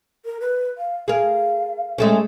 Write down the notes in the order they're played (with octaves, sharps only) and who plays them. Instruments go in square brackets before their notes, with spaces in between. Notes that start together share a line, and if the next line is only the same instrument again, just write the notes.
[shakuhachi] A#4
B4
F5
[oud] G#4 A#4 [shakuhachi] F5
[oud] G#3 A3 C#4